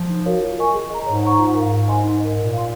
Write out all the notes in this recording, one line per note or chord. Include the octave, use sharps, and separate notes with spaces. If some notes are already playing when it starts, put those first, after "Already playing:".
Already playing: F3
D#4
F#4 A#4 C#5 F5
F4
A#4 D#5 G#5 C#6
G#4
D#5 A#5
G#2 C#5
F#5 A#5 C#6
F4
A#4 F5
G#2 G#4
D#5 G#5 C6
D#4
A#4 D#5
A#2 A#4
F5 C6